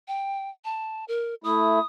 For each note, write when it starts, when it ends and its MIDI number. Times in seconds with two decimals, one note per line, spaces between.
0.08 0.50 79
0.65 1.05 81
1.08 1.35 70
1.44 1.79 57
1.44 1.79 64
1.44 1.86 87